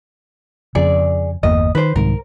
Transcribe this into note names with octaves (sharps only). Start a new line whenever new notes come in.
F2 C#3 G#4 D5
G1 E2 A#3 D#5
D#3 B4 C5
C2 G#2 D#3 A#4